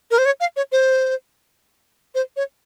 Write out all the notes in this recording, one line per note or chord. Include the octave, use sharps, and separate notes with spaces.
A#4
C5
C#5
F5
C#5
C5
C5
C#5